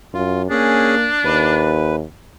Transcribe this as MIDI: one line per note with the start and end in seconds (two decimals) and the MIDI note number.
0.14 0.48 42
0.14 0.42 65
0.50 1.09 58
0.50 0.95 61
0.50 1.83 62
0.50 0.95 68
1.25 2.03 39
1.25 1.96 71